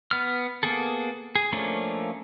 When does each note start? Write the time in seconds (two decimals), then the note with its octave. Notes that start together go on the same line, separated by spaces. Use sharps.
0.11 B3 F6
0.63 A#3 B3 G#4 A4
1.36 G#4
1.52 F3 A3 A#3 C#4 D4